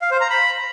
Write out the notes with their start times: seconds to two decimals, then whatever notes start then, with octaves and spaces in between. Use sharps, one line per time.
0.02 F5
0.11 C5
0.20 A#5
0.30 B5